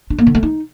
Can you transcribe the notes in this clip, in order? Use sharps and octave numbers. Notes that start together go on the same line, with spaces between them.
D4
A#3
D3
A3
D#4